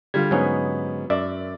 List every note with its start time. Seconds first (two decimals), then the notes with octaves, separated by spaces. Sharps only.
0.14 D3 G3 F4 G#6
0.31 G#2 F#3 B3 C#4 D#4
1.10 F#2 D5 E5